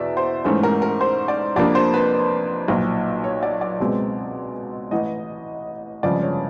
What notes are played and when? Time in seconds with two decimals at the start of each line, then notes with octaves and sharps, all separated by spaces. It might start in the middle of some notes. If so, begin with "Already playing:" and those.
Already playing: E2 B2 D5 E5
0.17 C5
0.45 G#2 E3 A3 C#4 C5
0.63 A#4
0.82 A#4
1.01 C5
1.28 D5
1.56 F2 C3 F3 A#3 D4 D5
1.75 C5
1.94 B4
2.68 B1 A#2 F3
3.24 C#5
3.43 D5
3.61 D5
3.79 C#2 B2 G#3 C4
4.91 A1 A2 E3 D#5
6.03 G1 F2 C#3 F3 G#3 D5
6.22 C#5